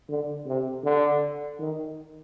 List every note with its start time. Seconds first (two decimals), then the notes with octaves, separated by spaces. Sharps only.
0.09 D3
0.46 C3
0.84 D3
1.59 D#3